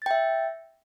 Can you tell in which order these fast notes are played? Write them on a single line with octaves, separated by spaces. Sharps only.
A6 G5 E5